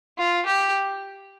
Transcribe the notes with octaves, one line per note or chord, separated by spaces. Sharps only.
F4
G4